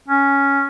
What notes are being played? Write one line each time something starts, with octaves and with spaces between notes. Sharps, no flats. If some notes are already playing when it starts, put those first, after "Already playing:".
C#4